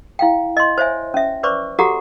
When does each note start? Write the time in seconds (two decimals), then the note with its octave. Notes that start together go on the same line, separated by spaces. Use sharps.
0.19 E4 F5 G5
0.57 D#5 C6
0.78 C5 C#5 E5 G#5
1.14 C#4 E5
1.43 B4 C5 D5 C#6 D6
1.79 F#4 G4 A4 F#5 A#5 D6